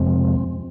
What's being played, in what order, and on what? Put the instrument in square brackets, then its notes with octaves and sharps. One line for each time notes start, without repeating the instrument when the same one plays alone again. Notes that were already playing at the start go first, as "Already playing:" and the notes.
Already playing: [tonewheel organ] F2 C3 F3 G#3 C4